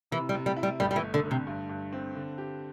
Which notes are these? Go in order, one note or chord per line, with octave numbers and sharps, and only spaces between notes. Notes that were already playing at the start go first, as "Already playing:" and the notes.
C3 E3
G3
C3
G3
E4
G3
G1 G3
G3
E3
A3
D3
D3
C3
G2
G2
C4
D3
G4